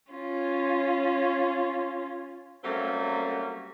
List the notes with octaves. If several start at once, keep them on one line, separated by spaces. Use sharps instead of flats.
C#4 F4
F#3 G3 A3 A#3 C4 C#4